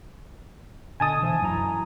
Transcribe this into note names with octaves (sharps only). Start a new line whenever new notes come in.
B2 D3 D#5 G#5 A5 D#6
E3 C5 E5
F#2 E4 A#5